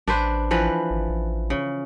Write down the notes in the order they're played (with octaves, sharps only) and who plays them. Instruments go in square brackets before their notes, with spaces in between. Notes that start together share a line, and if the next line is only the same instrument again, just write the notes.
[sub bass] A1 [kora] D4 B4 C5
[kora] E3 F3 B4
[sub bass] G#1
A1
[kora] C#3